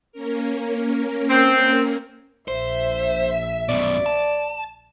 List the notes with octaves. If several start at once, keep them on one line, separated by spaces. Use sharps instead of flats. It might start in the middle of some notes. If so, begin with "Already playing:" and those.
A#3 C#4 A#4
C4
A#1 C5 E5
F#2 B2 D5
A5